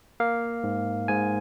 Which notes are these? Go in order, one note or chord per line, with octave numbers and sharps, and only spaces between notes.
A#3 F5
G#2
G#2 G#5